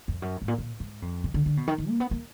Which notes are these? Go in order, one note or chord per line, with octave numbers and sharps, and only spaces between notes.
F2
F#2
G#2
A#2
A#2
G#2
F2
B2
D3
D3
B2
D#3
D#3
A#3
B3
A#3